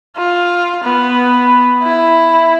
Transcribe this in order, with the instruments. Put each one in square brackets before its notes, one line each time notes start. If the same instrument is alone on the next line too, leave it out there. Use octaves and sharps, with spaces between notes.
[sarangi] F4
B3
E4